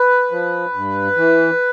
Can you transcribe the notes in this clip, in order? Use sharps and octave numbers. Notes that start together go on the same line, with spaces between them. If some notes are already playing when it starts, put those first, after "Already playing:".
Already playing: B4
F3
G2
E3